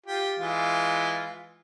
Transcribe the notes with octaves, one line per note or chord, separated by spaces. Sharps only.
F4 G4
E3 G#3 F4